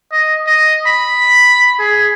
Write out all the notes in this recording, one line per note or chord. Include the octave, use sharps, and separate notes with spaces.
D#5
D#5
B5
G#4